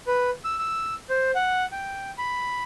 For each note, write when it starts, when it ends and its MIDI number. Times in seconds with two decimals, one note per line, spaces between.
0.07 0.30 71
0.44 0.57 88
0.59 0.94 88
1.10 1.31 72
1.35 1.66 78
1.72 2.11 79
2.18 2.64 83